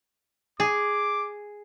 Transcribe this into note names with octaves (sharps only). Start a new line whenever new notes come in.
G#4 D6